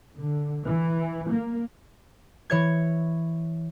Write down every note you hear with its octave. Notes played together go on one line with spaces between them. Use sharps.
D3
E3
A#3
E3 C#5 G#6